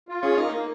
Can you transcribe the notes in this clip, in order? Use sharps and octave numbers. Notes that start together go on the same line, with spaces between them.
F4
C#4 G#4 C#5
A#3 D#4 D#5
A#3